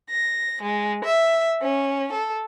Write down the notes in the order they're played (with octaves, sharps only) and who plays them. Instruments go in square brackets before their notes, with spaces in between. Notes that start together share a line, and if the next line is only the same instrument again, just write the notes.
[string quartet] A#6
G#3
E5
C#4
A4